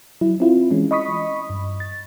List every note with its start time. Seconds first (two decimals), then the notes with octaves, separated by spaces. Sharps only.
0.21 F#3 E4
0.40 C4 E4 F4
0.71 E3 G#3 C#4
0.91 D#5 B5 C#6 D#6 B6
1.50 G2
1.80 A6